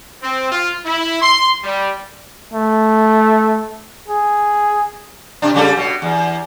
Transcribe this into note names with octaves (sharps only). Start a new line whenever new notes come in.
C4
F4
E4
C6
G3
A3
G#4
C3 D4
C#3 G3 A4
B2
E2